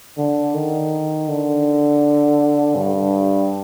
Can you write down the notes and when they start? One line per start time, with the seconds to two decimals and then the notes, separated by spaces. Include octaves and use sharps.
0.18 D3
0.54 D#3
1.29 D3
2.75 G2